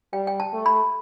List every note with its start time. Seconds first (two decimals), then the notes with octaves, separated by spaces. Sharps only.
0.13 G3 G5
0.27 G5
0.40 A5
0.53 A3
0.66 B5